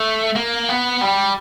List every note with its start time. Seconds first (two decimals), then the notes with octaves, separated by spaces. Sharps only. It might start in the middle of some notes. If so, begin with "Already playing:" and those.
Already playing: A3
0.36 A#3
0.69 B3
1.01 G3